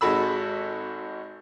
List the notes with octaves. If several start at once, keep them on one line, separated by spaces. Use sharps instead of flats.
G#1 G#3 F#4 A4 B5 E6